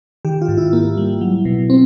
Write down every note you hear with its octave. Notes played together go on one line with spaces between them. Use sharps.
D#3 G4
F4
G#2
E4
A#3
G3
F#3
B2
C4